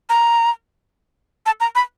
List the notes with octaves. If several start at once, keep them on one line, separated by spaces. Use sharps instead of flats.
A#5
A5
A#5
B5